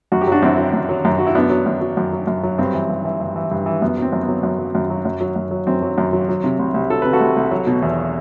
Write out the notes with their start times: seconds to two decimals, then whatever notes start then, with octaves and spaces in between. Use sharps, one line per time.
0.12 F#2 F#4
0.21 G4
0.27 F#3 D4 F#4
0.42 F#2 C4 E4
0.58 F#3
0.73 F#2
0.89 F#3
1.05 F#2
1.18 F#3 F#4
1.27 E4
1.35 F#2 B3 D4
1.50 F#3
1.66 F#2
1.81 F#3
1.97 F#2
2.13 F#3
2.27 F#2
2.43 F#3
2.58 G2 C4
2.74 E3
2.90 G2
3.05 E3
3.20 G2
3.36 E3
3.51 G2
3.66 E3
3.82 F#2 B3
3.97 F#3 C4
4.13 F#2
4.23 B3
4.28 F#3
4.43 F#2
4.59 F#3
4.75 F#2
4.90 F#3
5.05 F#2
5.21 F#3
5.36 F#2
5.51 F#3
5.67 F#2 C4
5.82 F#3
5.98 F#2
6.13 F#3
6.29 F#3
6.44 C3
6.59 C2
6.74 C2
6.90 F#3 A4
7.02 C3 B4
7.13 F#4 A4
7.21 C2
7.37 C2
7.51 F#3
7.67 B2
7.82 E2